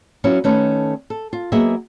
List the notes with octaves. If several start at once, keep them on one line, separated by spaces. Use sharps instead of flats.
F#3 B3 C#4 E4 F4
D#3 A3 C#4 A4 B4
A4
F4
F#3 A#3 B3 G#4 D#5 E5